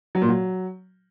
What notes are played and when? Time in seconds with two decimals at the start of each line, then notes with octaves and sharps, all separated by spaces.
0.15 F#3
0.22 A#2
0.29 F#3